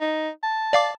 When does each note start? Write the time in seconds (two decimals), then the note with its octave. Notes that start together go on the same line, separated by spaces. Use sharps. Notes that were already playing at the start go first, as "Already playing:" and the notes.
0.01 D#4
0.43 A5
0.73 D5 F5 D6